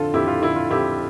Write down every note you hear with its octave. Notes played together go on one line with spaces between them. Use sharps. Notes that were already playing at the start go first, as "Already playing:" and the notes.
Already playing: F2 D3 F4 A4
F2 E4 G4
F4
D3 E4
F4
F2 E4 G4